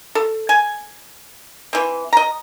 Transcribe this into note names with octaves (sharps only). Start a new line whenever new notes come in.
A4
G#5
E3 C4
D#5 A#5